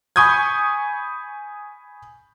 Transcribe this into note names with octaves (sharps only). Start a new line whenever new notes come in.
G#5 B5 C#6 D#6 G6 G#6